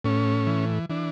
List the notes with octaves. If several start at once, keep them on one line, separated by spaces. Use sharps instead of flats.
A2 C#4
E3
E3 D4